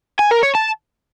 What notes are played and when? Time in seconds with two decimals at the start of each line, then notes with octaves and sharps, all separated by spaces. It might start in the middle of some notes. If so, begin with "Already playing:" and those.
0.19 G#5
0.31 A#4
0.43 C#5
0.55 A5